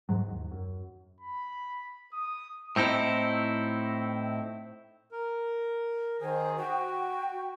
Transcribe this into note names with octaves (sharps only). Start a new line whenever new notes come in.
G#2 F#3
D#2
F#2
B5
D#6
A2 C4 D#4 E4
A#4
D#3 G#4 C5
F#4 G5